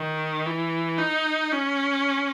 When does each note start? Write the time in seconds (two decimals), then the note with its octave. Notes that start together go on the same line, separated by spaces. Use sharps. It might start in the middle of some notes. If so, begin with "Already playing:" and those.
Already playing: D#3
0.46 E3
0.98 D#4
1.52 C#4